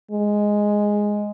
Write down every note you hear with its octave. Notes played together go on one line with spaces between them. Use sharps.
G#3